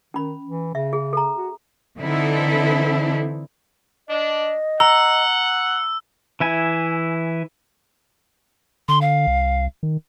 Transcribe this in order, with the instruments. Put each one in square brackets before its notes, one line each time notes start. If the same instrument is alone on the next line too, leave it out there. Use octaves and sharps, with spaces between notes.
[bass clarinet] D#3 [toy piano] C#4 B5
[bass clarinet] E3
[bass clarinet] C#3 [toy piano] E5
[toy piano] G#4
A4 A#5
[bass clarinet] F#4
[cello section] D3 E3 C4 D#4 E4 A4
[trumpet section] D4 [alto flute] D#5
[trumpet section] F#5 [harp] A#5 [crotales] E6
[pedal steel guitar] E3 E4 G#5
[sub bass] D3 [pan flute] C6
[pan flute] F5
[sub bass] C2
D#3